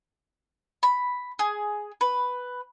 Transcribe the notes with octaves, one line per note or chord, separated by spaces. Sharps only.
B5
G#4
B4